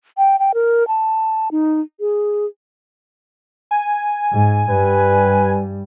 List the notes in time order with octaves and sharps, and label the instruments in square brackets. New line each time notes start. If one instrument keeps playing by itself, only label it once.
[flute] G5
G5
A#4
A5
D#4
G#4
[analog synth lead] G#5
[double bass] G#2
[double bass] G2 G3 [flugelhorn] B4